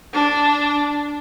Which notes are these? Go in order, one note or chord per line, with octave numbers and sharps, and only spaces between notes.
D4